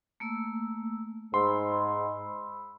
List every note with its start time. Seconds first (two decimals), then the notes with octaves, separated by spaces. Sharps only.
0.20 A3 A#3 E6
1.34 G#2 B5 C6 E6